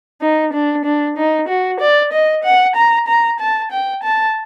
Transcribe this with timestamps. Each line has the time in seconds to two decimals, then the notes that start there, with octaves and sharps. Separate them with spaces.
0.21 D#4
0.53 D4
0.85 D4
1.17 D#4
1.48 F#4
1.80 D5
2.12 D#5
2.44 F#5
2.76 A#5
3.08 A#5
3.40 A5
3.71 G5
4.03 A5